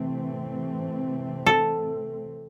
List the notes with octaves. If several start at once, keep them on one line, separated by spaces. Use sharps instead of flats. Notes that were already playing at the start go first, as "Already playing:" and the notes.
Already playing: C3 E3 A3 C4
A4